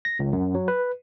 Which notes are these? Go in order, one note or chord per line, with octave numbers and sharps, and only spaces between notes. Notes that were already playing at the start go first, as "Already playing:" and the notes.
A#6
C#2
F#2
F#3
B4